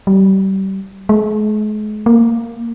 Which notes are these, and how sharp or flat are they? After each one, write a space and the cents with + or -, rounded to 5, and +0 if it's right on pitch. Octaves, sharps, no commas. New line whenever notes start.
G3 -30
G#3 +40
A#3 -10